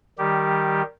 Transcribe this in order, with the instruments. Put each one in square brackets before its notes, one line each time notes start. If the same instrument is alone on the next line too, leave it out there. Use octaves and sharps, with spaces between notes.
[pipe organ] D#3 G3 G4